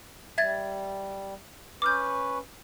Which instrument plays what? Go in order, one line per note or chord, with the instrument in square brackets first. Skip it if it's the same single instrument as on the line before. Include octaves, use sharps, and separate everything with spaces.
[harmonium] G3 [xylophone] E5 G#6 A6
[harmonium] C#4 B4 [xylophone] D6 F6 G6